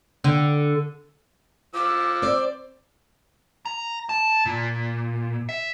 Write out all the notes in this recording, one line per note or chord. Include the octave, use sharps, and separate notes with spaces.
D3
F3 D6 E6
C4 C5 D5
A#5
A5
A#2
E5